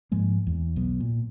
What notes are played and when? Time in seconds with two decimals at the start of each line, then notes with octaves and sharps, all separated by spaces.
0.12 G#2 F3 G#3 A#3
0.47 E2
0.76 B1 F#3 B3
1.00 A#2